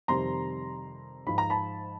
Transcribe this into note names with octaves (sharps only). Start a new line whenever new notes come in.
F2 C3 D#3 G3 A#5 C6
G#2 F3 B5
A#5
A5 B5